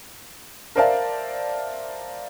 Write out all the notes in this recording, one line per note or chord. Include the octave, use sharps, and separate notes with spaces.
A#4 C5 D5 E5 F5 A5